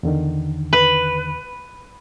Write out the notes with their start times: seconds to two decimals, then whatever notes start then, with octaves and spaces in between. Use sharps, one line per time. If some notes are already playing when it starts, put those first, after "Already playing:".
0.03 E2 D3 D#3
0.73 B4